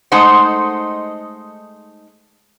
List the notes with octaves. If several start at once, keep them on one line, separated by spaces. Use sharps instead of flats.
G#3 A3 D#4 C5 F#5